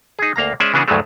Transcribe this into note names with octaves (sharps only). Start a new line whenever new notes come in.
D#4 G#4
D2 A#3 F5 A#5
G#3 C#4 C5 D5 E5 G#5
C#3 E3 B3 D4 F#4 G#4
D2 G2 E3 F#3 G#3 A3